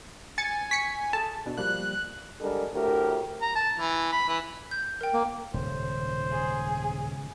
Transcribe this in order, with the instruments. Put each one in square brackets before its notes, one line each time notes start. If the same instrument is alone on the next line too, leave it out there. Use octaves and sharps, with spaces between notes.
[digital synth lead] G#5 [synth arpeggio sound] A6 C#7
[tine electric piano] C#6 [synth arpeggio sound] B6 C#7
[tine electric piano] G#4 A4 [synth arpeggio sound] A5
[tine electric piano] B2 D4
[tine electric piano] F3 G3 A#3 [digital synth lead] F#6
[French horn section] D3 G3 G#3 A4 A#4
D2 A2 G4 A#4
[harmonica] A#5
A5
E3
B5
E3
[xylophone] G6
A#4 G5
[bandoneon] A#3
[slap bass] D#1 [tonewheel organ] G#2 C#3 [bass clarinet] C5
[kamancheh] G#4